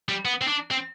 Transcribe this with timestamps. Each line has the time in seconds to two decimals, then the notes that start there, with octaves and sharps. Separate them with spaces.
0.09 G3
0.25 B3
0.42 C4
0.48 D4
0.71 C4